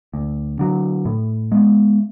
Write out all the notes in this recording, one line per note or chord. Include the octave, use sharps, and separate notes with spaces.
D2
D3 F#3
A2
G#3 B3